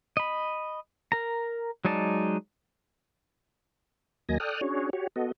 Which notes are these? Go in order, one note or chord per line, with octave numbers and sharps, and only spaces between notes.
D#5 B5
A#4 A#5
F#3 G#3 D#4 D5 A5
D#2 F#3 A#3 D#5 G#5 A#6
A4 D5 G5 D#6 F6 F#6
C#4 D4 F#4 G#4 C#5
F#4 G4 C#5
B3 F#4 A4 D#5